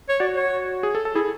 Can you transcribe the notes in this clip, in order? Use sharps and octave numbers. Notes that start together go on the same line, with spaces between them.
C#5
F#4 D5
C#5
G#4
A4
A4
E4 G#4